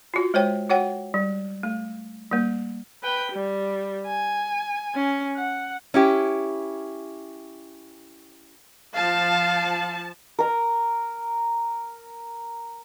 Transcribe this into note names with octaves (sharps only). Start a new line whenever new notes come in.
F4 F#4
G#3 C5 C#5 G5
F#4 C#5 F#5 G5
G3
A3
G3 A#3
B4 G5
G3
G#5
C#4
F#5
C#4 E4 G4
F3 F5 A5
A#4 A#5